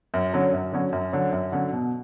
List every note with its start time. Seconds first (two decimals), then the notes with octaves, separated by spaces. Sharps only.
0.14 F#2
0.33 D3 F#3 C#4
0.53 F#2
0.72 D3 F#3 C#4
0.93 F#2
1.13 D3 F#3 C#4
1.32 F#2
1.52 D3 F#3 C#4
1.73 B2